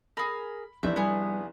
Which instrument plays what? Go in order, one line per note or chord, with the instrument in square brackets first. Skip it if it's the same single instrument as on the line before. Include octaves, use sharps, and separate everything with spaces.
[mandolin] G#4 A#4 [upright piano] B5
[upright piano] F1 D4 E4 [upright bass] D#3 F3 [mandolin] E5 G6
[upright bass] G3 [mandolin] B3 G#4